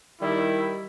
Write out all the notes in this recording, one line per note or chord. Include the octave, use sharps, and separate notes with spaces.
D#3 G3 E4